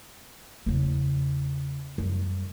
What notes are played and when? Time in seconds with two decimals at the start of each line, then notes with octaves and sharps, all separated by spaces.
0.66 E2 C#3
1.98 F#2 G3